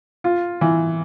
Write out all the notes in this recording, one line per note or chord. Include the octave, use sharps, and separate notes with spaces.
F4
E3